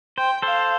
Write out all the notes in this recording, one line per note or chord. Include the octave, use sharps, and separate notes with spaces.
C5 G5
A4 C5 F5